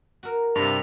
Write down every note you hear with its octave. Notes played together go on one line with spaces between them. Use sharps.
F#4 A#4
G2 C3 F7